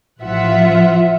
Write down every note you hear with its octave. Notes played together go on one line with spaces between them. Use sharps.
A1 F3 F4 E5 F#5